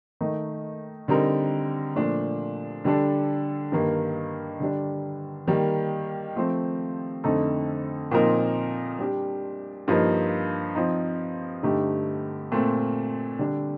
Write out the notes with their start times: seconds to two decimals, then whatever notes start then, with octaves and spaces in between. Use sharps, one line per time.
0.21 D#3 A3 D#4
1.08 D3 G3 C4 D#4 A#4
1.96 A#2 F3 A3 D4
2.84 D3 G3 D4 A4
3.72 G2 D#3 A#3
4.60 D3 G3 D4
5.47 D#3 G3 A#3
6.36 F3 A3 C4
7.24 F2 D3 A3 D#4 A4
8.11 A#2 F3 C4 D#4 A#4
8.99 G3 D4 G4
9.88 G2 F3 A#3 D#4
10.75 F3 C4 D#4
11.63 G2 D3 A3 D#4 G4
12.52 A#2 A3 C4
13.39 D3 G3 D4